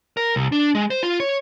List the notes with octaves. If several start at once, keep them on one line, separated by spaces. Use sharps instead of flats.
A#4
C2
D4
G#3
C5
F4
C#5